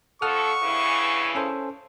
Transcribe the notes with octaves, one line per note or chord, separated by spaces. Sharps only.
F2 A4 F#5 C#6 D#6 F6
G2 C#3 E3
C#4 A4 C5